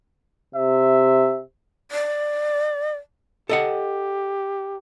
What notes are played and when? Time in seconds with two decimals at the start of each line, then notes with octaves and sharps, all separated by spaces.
0.55 C3 E5
1.92 D5
3.49 G4 A4 D#5 F#5